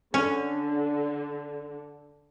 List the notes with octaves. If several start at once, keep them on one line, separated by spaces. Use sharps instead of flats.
D3 C#4